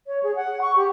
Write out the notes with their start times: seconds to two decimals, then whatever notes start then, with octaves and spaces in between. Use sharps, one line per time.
0.07 C#5
0.23 G#4
0.36 F#5
0.61 C#6
0.76 G4